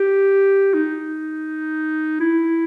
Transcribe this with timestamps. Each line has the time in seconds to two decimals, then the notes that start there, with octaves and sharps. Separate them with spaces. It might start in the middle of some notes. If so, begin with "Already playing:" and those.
Already playing: G4
0.74 D#4
2.20 E4